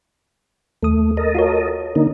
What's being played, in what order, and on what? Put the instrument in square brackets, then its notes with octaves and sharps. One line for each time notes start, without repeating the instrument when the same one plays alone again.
[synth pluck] D#2 D#6 [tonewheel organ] A3
[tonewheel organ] A4 A#4 D#5
[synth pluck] F4 F#4 C#5
[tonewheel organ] D3 A#3 D#4